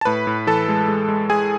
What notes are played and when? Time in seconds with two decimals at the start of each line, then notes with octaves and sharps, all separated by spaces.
0.01 A5
0.05 A2 B4 B5
0.27 A2
0.47 E3 A4 A5
0.69 G#3
0.88 G#3
1.09 G#3
1.30 G#3 G#4 G#5